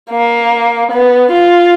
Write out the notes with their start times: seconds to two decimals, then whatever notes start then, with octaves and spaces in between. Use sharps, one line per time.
0.10 A#3
0.91 B3
1.31 F4